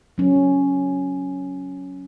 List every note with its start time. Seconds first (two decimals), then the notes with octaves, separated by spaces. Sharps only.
0.18 F#3 C#4